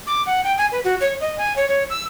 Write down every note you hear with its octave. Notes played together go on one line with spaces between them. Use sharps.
D6
F#5
G5
G#5
B4
F#4
C#5
D#5
G#5
C#5
C#5
E6